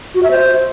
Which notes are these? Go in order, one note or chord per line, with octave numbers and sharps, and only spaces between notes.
F#4
E5
C5